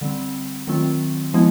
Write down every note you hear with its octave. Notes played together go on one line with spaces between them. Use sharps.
D3 G3 C4
D#3 F#3 A3 C4 F4
F3 G#3 B3 E4